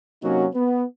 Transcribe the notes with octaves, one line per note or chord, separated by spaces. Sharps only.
C3 F#3 A#3 C#4 D#4 F#4
B3